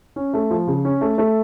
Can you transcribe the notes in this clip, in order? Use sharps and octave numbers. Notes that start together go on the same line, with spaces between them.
C#4
A3
F3
C#3
C#4
A3
A3